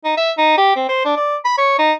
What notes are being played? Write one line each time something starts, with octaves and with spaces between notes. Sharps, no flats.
D#4
E5
D#4
G4
C4
C5
D4
D5
B5
C#5
D#4